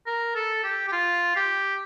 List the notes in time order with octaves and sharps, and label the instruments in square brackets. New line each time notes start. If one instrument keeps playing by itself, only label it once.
[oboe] A#4
A4
G4
G4
F4
G4